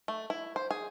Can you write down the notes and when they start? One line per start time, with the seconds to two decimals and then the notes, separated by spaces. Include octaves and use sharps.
0.08 A3
0.30 E4
0.56 C5
0.71 G#4